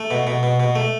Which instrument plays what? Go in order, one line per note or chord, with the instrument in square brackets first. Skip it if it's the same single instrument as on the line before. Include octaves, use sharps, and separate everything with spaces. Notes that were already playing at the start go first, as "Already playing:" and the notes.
Already playing: [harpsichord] A3
B2
B2
B2
B2
A3